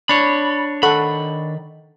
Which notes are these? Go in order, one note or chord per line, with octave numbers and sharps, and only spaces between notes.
D4 C#5 B5
D#3 A4 F#5 B5 C#6